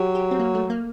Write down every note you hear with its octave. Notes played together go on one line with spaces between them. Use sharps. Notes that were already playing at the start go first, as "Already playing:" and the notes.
Already playing: F#3 G4 A4
G4
C4
A#3
A3
A#3